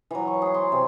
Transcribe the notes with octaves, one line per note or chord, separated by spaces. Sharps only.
E3 F#3
C#6
G#4 C#5
C6
C3